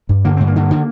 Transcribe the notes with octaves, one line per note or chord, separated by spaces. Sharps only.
G2
D3 A#3
G2 C4
A#3
D3
D3